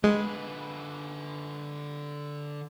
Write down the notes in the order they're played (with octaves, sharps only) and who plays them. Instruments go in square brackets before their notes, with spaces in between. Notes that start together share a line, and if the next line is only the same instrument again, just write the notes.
[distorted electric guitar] D3 B4 [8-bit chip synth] G#3